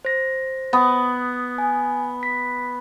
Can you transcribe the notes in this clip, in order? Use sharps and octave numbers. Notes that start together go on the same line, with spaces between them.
C5 A#6
B3
G#5
B6